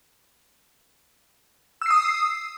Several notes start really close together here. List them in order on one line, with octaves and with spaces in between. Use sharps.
E6 C7 D#6